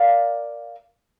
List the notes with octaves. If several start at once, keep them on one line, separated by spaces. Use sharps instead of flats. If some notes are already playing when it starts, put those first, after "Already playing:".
Already playing: A#4 D5 F5